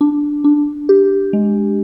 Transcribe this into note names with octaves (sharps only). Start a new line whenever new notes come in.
D4
D4
G4
G#3